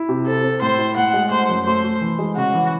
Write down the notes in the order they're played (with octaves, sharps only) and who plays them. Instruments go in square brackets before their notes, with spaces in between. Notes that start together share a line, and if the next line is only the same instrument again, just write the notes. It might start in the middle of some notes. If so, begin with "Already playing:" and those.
Already playing: [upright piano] E4
C3
[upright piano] C4 [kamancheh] A4
[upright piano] C4
[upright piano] A2 [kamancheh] C5
[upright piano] E4
[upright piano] A2 [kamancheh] F#5
[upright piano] G#3
[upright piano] A3 [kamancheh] C5
[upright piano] F#2
[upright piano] A3 [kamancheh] C5
[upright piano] A3
E3
G#3
[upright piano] C#3 [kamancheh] F#4
[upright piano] E3